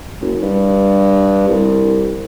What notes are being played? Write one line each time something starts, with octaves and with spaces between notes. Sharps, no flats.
F#1
G2
C2